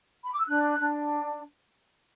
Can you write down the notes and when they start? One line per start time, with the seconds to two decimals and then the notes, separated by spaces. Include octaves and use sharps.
0.25 B5
0.31 D6
0.39 E6
0.46 D4 F#6
0.78 D4